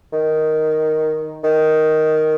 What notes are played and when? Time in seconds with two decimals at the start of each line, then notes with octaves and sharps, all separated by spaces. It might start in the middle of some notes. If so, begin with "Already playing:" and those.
0.13 D#3
1.44 D#3